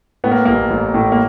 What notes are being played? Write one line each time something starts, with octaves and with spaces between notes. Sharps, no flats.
A2 B3
A#3
A1 A#3
A1
A2
A#3